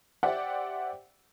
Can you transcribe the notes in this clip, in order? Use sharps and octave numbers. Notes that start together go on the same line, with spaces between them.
G4 C5 D5 E5 F#5 G5